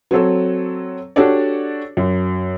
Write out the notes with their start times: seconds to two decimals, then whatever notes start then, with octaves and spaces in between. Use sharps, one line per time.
0.11 F#3 C4 A4 C#5
1.16 D4 F#4 G4 A4 C#5 D5
1.97 F#2